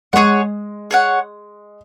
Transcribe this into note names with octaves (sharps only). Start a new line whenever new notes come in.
G#3 G#4 C#5 F#5
G#4 C#5 F#5